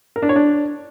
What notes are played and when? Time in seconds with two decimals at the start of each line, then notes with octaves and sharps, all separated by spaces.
0.16 A#4
0.23 D4
0.29 C#5
0.36 D4